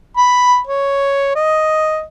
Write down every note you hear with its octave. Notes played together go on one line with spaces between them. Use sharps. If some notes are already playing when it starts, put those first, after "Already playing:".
B5
C#5
D#5